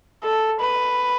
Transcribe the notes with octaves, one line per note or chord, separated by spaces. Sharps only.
A4
B4